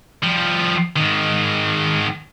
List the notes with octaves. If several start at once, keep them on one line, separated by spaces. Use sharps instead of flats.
F3 G3
G#2 D#3